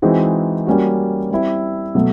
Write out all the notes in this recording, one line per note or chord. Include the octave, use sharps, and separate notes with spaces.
E3 G#3 C4 D#4 F#4
G3 A#3 C#4 F#4
G3 C4 E4
B2 F#3 A3